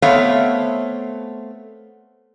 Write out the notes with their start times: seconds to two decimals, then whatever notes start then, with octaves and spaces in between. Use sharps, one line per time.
0.02 A3 B3 C4 C#5 F5